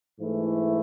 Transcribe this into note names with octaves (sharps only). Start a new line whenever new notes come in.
G#2 E3 A3 E4